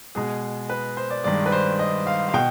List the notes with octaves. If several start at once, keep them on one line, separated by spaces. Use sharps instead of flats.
B2 G#3 G#4
B4
C5
D5
G2 D#3 G#3 D5
B4
C5
D#5
F5
F5
B2 G5